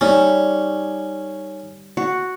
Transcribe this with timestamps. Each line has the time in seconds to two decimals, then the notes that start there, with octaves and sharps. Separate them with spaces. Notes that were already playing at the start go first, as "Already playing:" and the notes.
0.01 G3 C#4 D#4 E5
1.97 F#4